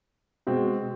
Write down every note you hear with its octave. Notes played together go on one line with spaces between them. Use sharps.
B2 G#3 C4